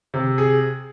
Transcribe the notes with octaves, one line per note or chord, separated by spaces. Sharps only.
C3
G#4